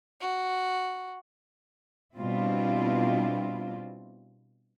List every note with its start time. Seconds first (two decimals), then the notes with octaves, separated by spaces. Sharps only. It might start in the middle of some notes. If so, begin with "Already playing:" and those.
0.21 F#4
2.17 B2 G3 C4 D4 E4 F4